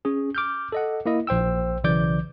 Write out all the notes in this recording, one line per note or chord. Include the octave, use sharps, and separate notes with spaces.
C#4 G#4
D6 F6 G6
A4 D#5 F#5
A#3 E4 D#5
A#1 C5 G5 E6
B1 C#3 E3 D5 D6 G6